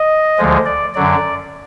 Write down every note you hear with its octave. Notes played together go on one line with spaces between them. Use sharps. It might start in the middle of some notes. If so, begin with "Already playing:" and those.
Already playing: D#5
D2 D3 F3 G#3
D5
F#2 D3 F#3 D5